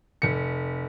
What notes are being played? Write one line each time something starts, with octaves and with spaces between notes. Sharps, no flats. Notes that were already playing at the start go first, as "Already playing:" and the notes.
F1 C#7